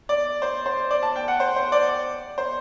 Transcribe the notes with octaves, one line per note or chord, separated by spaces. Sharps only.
D5
C5
C5
D5
A5
G5
F#5
C5
C5
D5
C5